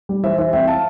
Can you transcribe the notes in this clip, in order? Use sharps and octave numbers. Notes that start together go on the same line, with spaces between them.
G3
E3 C5 E5
E3 C5 E5
C2 E5 G5
F5 A5